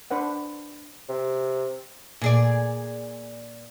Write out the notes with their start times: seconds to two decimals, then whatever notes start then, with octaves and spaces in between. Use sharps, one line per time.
0.11 D4 B4 C5 F#5
1.09 C3
2.21 A#2 G#4 D5